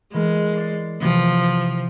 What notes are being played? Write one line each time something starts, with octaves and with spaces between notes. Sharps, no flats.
E3 G#3 A#4
D5 D6 C7
C3 E3 F3